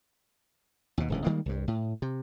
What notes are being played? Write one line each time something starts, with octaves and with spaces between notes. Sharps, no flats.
D#2 B2
D1 C#2 E3
D#3 G3 G#3 A#3
C2 G2
A2
C3